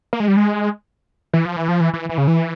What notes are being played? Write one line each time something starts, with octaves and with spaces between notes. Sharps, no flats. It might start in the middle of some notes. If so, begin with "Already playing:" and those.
A#3
G#3
G3
G#3
E3
F3
E3
F3
E3
E3
E3
C#3
E3